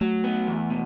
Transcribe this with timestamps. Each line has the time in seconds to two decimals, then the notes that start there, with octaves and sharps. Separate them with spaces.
0.01 F#3 A3
0.24 B3
0.47 E2
0.70 B2